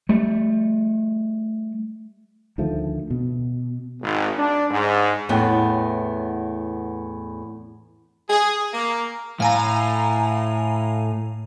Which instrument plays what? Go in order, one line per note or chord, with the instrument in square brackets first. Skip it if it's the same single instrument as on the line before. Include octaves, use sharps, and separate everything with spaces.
[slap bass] G3 A3
[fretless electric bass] D2 D#3 F3 A3
B2
[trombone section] G#1
D4
G#2
[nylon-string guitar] E2 A2 B3 E4 C#5 G5
[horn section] G#4
A#3
[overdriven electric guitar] A2 [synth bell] F5 G#5 A#5